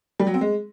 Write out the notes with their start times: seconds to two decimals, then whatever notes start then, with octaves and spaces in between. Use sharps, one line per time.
0.20 G3
0.27 F#3
0.34 C4
0.41 G#3